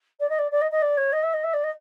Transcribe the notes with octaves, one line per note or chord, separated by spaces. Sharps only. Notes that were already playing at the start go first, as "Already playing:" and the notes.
D5
D#5
D5
D5
D#5
D#5
D5
C#5
D#5
E5
D#5
E5
D5
D#5